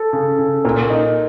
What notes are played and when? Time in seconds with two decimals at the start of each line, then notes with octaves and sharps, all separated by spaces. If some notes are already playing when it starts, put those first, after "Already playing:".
Already playing: A4
0.13 C#3
0.39 C#3
0.65 A#2 A#4
0.90 D#4